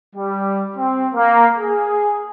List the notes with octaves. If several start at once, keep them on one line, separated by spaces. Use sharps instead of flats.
G3
C4
A#3
G#4